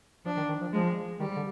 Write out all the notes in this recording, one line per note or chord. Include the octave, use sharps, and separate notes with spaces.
F3 D4
D#3
D#3
F3
F3 G#3
D#3 G3
D3